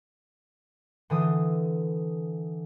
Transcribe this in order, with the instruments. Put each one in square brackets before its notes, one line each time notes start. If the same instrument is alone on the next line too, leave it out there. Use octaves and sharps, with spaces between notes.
[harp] D3 E3 D#6